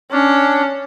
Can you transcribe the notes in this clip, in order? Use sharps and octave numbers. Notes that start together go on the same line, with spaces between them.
C#4 D4